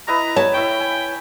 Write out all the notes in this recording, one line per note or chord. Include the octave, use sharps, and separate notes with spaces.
E4 B4 D#5 A#5
C#5 A5
E4 G5 C#6
G#5